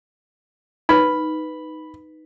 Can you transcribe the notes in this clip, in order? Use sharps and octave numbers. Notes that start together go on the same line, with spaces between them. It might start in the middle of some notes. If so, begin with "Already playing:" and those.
D#4 B4 B5